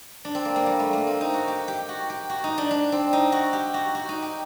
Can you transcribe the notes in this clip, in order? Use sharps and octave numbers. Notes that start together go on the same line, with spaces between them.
D4
C4
A#3
A#3
G3
A3
A#3
C4
D#4
F#4
G4
G4
F#4
G4
F#4
D#4
D4
D4
C4
D#4
F#4
G4
F#4
F#4
D#4
G4